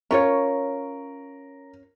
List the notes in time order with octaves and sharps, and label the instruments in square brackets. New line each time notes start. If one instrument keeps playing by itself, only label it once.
[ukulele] C#4 F4 C#5 [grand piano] A#4